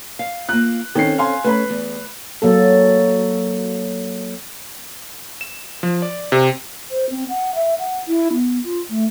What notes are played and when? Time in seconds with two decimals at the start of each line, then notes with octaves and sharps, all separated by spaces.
0.19 F5
0.49 A#3 F4 F#6
0.95 D#3 C4 C#4 A4 C7
1.18 F5 G#5 C6
1.44 A3 C#4 B4 B5
1.70 E2
2.42 F#3 A#3 A4
5.41 E7
5.83 F3
6.02 D5
6.32 C3
6.91 C5
7.10 C4
7.29 F#5
7.55 E5
7.79 F#5
8.08 E4
8.33 B3
8.64 F4
8.90 A3